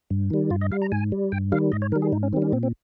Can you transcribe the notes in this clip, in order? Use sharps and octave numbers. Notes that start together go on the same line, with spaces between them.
G2
D#3 G3
G2 F4
D#5
G3 F5
A#5
G#2 G#5
G3
G2 G5
D#3 G3 F5
G#2 D#5
C#5
D#3 G3 A#4
G#4
G#2 D#4
C#4
D#3 G3 C4
C#4
A#2 C4
C4